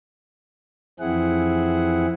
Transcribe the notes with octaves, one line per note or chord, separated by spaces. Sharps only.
F2 E3 C4 E4 G#4 F#5